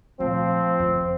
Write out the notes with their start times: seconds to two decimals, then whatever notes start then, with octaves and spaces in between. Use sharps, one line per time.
0.20 A#2 F3 A3 C4
0.79 F#1 F2